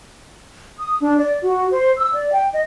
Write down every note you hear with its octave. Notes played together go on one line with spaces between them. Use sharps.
D#6
D4
D5
F#4
C5
E6
D5
G5
D#5